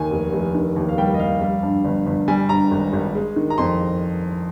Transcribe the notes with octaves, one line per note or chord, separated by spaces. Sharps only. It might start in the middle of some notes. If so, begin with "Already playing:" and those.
Already playing: D#2 D#3 G#5
F1
F1
D#3
D#2
F5
G3 G5
D#5
F1 F5
G3
G2
G1
G1
G3 G#5
G2 A#5
G#1
G#1
G#3
D#3
A#5
F2 C6